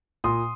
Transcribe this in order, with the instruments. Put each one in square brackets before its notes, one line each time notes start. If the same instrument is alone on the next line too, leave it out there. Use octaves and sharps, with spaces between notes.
[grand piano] A#2 C6 D#6